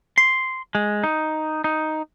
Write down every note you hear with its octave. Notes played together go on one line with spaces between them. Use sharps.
C6
G#3
D#4
D#4